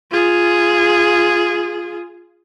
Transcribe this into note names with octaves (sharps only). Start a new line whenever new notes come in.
F4 G#4